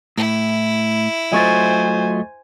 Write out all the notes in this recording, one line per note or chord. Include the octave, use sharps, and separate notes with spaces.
A2 E4
F#3 A3 F4 C5 D#5 G#5 C#6 A6